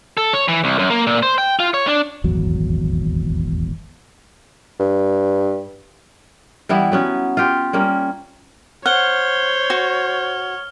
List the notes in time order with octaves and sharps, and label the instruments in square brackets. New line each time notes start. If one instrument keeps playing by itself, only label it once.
[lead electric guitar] A4
C#5
E3
C2
F#2
A#3
A#2
C5
G5
F4
C#5
D4
[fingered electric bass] D#1 G#1 E2 F#3
[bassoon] G2
[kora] E3 G3 B3 E4
F#3 B3 C#4
F4 G4
G3 A#3 C#4
[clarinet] C5 [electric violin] C#5 [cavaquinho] F#5 [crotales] F6 G7
[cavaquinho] F#4